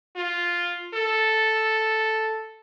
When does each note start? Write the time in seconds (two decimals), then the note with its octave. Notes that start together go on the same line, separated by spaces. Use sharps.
0.16 F4
0.94 A4